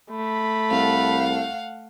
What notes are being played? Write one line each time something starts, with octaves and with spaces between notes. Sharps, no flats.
A3 B5
C2 F5 F#5